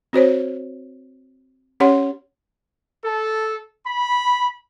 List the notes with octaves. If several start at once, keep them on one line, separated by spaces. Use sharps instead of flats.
C4 F#4 C5 C#5
C#4 G4 C#5 F#5 C6
A4
B5